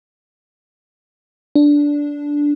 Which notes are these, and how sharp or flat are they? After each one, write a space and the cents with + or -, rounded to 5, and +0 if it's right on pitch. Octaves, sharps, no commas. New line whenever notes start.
D4 -10